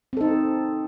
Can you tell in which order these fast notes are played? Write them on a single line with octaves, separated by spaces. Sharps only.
C4 A4 D#4